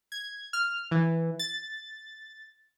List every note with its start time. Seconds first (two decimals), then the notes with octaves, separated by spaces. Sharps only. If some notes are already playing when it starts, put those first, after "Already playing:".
0.12 G#6
0.53 F6
0.91 E3
1.39 A6